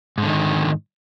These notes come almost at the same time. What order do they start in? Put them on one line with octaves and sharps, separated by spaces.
G#2 D3 D#3